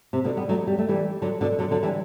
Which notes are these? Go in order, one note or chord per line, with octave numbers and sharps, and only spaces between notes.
C3
B2 D3
G3 B3
F#3 A3
G3
A3
E3 G3
D3 F#3
B2 D3
D3 F#3
D3 F#3
E3 G3